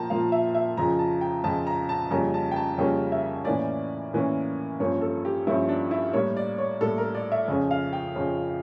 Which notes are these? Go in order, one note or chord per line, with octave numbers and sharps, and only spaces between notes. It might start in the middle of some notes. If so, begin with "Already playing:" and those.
Already playing: A#2 F3 A#3 G5 A5 A#5
A#2 F3 A#3 F5
E5
E5
F2 C#3 F3 A#5
A5
G5
F2 C#3 F3 A5
A#5
A5
F2 C#3 G3 A#3 C#4 A#5
A5
G5
A5
F2 C#3 G3 A#3 C#4 G5
E5
A2 E3 A#3 C#4 D5
A2 E3 A#3 C#4
G2 F3 A#3 C#4 C#5
A4
G4
G2 F3 A#3 C#4 E4
D4
E4
A2 G3 A#3 C#5
D5
C#5
A2 G3 A#3 A4
A#4
D5
E5
F2 C#3 F3 C#4
F5
G5
F2 C#3 F3 C#4